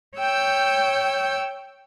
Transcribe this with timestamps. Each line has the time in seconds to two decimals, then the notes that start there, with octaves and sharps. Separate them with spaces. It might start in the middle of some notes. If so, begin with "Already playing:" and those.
0.18 C#5 G5 E6 G6